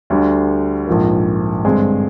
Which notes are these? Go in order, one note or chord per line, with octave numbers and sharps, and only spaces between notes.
D2 D3 G3
A#1 G#2 F3 A#3
G2 D3 G#3 C4